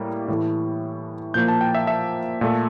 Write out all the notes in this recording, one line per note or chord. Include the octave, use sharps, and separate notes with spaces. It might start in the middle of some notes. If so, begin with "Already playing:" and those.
Already playing: A2 G3 A#3
A2 E3 A3
A#2 F3 A#3 G6
A5
G5
E5
E5
A#2 A3